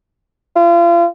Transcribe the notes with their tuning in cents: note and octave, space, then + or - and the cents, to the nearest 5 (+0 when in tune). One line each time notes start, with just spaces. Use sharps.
F4 -35